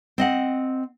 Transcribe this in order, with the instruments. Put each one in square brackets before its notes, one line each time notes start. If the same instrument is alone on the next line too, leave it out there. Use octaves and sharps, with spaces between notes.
[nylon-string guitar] C4 D#5 F#5